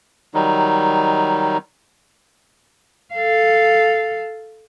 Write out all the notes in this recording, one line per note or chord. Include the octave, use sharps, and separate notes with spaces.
D#3 F#3 G3 D#4
A4 F5